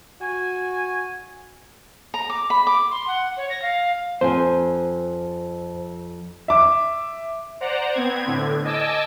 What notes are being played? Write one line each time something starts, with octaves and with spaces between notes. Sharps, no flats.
F#4 G#5
A#5
D6
B5
D6
C6
F#5
C#5
A#6
F5
F2 C5 G#5
E5 D6
C5 D5 F#5 A#5
B3 C4 G#6
A2 D3
D#5 G#5 A5 D6 E6